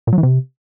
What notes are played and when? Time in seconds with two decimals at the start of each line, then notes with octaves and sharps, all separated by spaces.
0.07 A#2
0.13 F#3
0.18 E3
0.23 C3